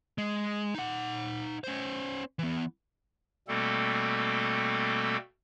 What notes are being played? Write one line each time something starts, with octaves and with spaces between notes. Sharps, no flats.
G#3
D#4 F#5
C#4 C5
E3 B3
B2 G3 A3 A#3 C4 A4